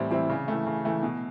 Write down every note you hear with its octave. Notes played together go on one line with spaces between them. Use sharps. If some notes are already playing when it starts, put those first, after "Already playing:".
Already playing: A2 E3 G3 C4 E4
E3 G3 C4 E4
C#3
E3 A3
C#3
E3 A3
B2